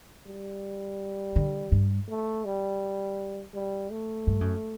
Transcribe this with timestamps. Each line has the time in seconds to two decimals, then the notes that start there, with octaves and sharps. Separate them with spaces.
0.27 G3
1.36 D3
1.72 G2
2.09 A3
2.45 G3
3.54 G3
3.91 A3
4.27 G2
4.41 F#2